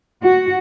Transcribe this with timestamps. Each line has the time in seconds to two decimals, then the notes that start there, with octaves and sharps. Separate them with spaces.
0.22 F#4